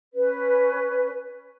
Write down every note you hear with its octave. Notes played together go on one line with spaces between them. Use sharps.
C#4 B4